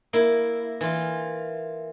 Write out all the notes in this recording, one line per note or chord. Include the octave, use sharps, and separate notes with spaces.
A#3 E4
E3 F4